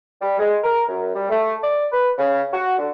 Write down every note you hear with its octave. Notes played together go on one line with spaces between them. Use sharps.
G3
G#3
A#4
F#2
G3
A3
D5
B4
C#3
F#4
D3